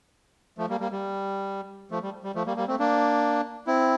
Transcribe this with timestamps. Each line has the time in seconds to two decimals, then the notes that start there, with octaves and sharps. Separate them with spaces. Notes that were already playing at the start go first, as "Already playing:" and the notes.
0.58 F3 A3
0.69 G3 A#3
0.80 G3 A#3
0.91 G3
1.91 F3 A3
2.02 G3
2.24 G3
2.35 F3 A3
2.46 G3 A#3
2.57 G3 A#3
2.68 A3 C4
2.79 A#3 D4
3.67 C4 E4